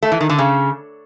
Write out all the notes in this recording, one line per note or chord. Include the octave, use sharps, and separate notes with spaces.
A3
E3
D#3
D3
C#3